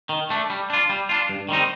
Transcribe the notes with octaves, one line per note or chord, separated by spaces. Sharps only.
D#3
A3 D4
G3
D4 F4
G3
D4 F4
G2
D#3 G3 C4 D#4